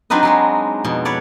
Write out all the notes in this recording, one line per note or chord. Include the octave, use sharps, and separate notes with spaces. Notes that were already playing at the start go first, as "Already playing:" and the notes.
F#3 C4 D4 D#4 B4 D#5
F#3 G#3 F#4
F2 B2
B4 C#5 D5